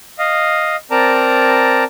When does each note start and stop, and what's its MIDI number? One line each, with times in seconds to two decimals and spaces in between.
0.19 0.76 75
0.19 0.76 77
0.91 1.84 60
0.91 1.84 70
0.91 1.84 74
0.91 1.84 81
0.91 1.84 82